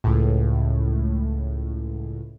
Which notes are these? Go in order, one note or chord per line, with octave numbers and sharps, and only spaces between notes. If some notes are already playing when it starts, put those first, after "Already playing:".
C#2 A2